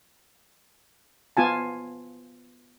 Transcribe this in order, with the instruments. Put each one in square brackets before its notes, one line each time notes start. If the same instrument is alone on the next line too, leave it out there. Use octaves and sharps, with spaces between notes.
[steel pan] B3 F4 G#5 A5